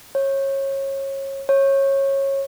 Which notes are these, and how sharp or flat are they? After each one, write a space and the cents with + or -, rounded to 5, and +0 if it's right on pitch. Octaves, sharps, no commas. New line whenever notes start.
C#5 -25
C#5 -20